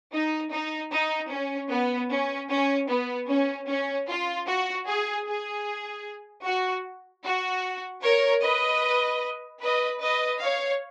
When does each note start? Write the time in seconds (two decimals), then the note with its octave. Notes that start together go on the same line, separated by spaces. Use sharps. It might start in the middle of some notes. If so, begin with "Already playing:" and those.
0.12 D#4
0.51 D#4
0.92 D#4
1.30 C#4
1.70 B3
2.11 C#4
2.50 C#4
2.89 B3
3.29 C#4
3.68 C#4
4.08 F4
4.47 F#4
4.87 G#4
5.26 G#4
6.44 F#4
7.24 F#4
8.03 A#4 C#5
8.42 B4 D#5
9.61 B4 D#5
10.01 B4 D#5
10.41 C#5 F5